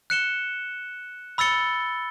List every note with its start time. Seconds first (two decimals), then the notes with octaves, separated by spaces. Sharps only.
0.10 F#6 C#7 E7 G7
1.38 B5 E6 A6 C#7 G7